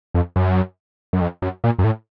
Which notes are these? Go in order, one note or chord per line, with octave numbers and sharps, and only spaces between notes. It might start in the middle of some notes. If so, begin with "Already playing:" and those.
F2
F#2
F#2
F2
F#2
A#2
F#2
A2